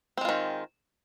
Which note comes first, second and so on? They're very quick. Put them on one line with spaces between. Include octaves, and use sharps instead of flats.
C4 G#3 F4 D#3